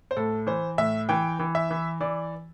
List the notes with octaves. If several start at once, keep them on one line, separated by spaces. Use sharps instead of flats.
C5
A2 A4
E3 C5
A2 E5
E3 G5
E3
E5
E3
E3 D5